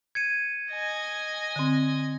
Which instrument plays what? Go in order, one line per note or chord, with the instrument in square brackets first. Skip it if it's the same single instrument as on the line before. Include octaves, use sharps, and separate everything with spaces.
[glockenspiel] G#6 C#7 D#7
[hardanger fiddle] D#5 G#5
[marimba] D3 C4